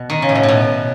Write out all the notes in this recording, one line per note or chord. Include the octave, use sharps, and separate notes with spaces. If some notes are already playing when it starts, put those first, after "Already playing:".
Already playing: B2
D#3
C#3
A2
B2
A2
B2